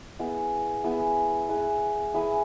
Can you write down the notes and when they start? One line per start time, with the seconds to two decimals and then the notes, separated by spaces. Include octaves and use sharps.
0.19 B3 E4 G#4
0.84 B3 E4 G#4
1.49 E4 G#4 B4 E5
2.14 E4 G#4 B4 E5